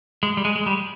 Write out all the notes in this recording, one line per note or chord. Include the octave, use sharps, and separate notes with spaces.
G#3
G3
G#3
G#3
G3